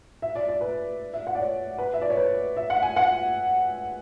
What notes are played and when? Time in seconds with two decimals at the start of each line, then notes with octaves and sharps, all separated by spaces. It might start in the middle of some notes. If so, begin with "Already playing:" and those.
0.22 E5
0.35 D5
0.49 D5
0.61 B4
1.13 E5
1.27 F#5
1.35 D5
1.40 C#5
1.78 B4
1.94 E5
2.02 D5
2.10 C#5
2.17 B4
2.57 E5
2.70 F#5
2.82 G#5
2.96 F#5